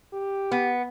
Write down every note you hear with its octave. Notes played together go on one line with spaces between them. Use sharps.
G4
B3